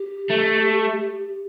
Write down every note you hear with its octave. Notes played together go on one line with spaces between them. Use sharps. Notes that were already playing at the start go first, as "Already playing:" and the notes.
Already playing: G4
A3